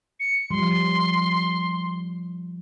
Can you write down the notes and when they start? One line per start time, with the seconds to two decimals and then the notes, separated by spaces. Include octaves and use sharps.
0.20 C#7
0.50 F3 G3 C6